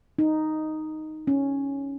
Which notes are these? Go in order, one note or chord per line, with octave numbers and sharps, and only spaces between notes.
D#4
C#4